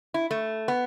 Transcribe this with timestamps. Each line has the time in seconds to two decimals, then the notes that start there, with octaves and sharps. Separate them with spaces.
0.14 E4
0.31 A3
0.68 B3